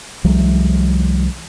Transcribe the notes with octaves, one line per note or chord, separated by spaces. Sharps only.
C2 E3 F#3 G#3